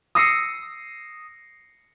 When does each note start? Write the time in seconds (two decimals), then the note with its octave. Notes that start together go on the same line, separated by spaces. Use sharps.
0.15 D#6 E6 A#6 C7 C#7 D#7